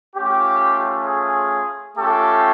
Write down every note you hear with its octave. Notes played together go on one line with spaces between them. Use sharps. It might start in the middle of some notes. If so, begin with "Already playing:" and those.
A3 C#4 F4 G4
G#4
A3 C#4 F4 G4 A4